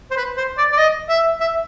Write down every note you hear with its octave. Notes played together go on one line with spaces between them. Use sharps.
C5
B4
C5
D5
D5
D#5
E5
E5